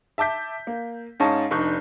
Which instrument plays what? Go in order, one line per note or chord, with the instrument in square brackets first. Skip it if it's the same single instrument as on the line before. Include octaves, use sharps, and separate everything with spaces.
[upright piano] E5 A5 D6 G6 B6
A#3
G#2 C#4 D#5 F5 A5 C#6
F1 D4 D#4 C#6 F#6 G6